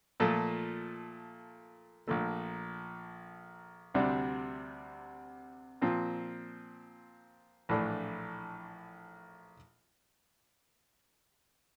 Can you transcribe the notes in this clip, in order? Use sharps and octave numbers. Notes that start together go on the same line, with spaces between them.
A#2 F3 A3
A#1 A#2 A3
D2 C3 G3 D4
A#2 F3 C4
A#1 A2 E3 A3 D4